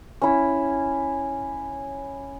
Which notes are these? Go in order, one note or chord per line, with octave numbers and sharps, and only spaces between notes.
C#4 E4